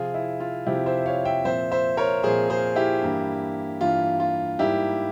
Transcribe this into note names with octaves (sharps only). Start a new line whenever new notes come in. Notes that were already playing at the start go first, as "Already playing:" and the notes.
Already playing: C3 F3 C4 F4 G#4
E4
F4
C3 F3 C4 E4 G4
C5 E5
C#5 F5
E5 G5
A#2 F3 C4 C5 E5
C5 E5
A#4 C#5
A#2 F3 C4 G#4 C5
G#4 C5
E4 G4
G2 E3 A#3
G2 E3 A#3 F4
F4
G#2 G3 A#3 E4 G4